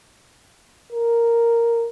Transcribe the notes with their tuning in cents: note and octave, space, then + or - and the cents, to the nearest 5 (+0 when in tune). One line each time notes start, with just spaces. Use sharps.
A#4 -5